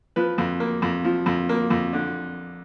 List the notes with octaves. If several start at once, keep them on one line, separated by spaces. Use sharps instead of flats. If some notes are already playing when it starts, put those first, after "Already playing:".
F3 B4
F2
A#3
F2
F3
F2
A#3
F2
D3